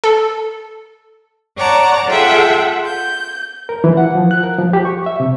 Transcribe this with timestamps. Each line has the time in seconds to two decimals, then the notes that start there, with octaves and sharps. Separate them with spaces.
0.04 A4
1.56 C#5 D5 F#5 A5 A#5
2.07 F4 G#4 A4 E5 F#5 G5
2.84 G6
3.69 A#4
3.84 E3
3.97 F#5
4.15 F3
4.31 F#6
4.43 A#4
4.59 F3
4.73 G4
4.85 C#6
5.06 E5
5.20 C3